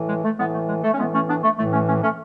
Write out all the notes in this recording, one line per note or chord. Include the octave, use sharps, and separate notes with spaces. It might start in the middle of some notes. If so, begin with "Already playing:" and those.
Already playing: A2 E3
G#3
A3
A2 E3 G#3 B3
A3
G#3
A3
C#4
A2 E3 G#3 B3
A3 C#4
B3 D4
A3
A2 E3 A3
A3 C#4
A3 C#4
A3 C#4